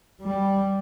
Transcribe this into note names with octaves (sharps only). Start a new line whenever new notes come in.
G3